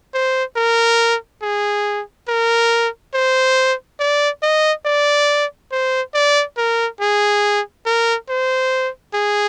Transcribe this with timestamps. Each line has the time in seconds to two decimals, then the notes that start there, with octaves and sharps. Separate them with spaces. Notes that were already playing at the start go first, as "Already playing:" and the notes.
0.14 C5
0.56 A#4
1.42 G#4
2.28 A#4
3.14 C5
4.00 D5
4.43 D#5
4.86 D5
5.72 C5
6.14 D5
6.57 A#4
7.01 G#4
7.86 A#4
8.29 C5
9.14 G#4